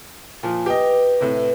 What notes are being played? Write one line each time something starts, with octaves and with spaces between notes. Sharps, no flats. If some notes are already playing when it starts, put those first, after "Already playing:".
A#2 F3
G4 B4 D#5
A2 C3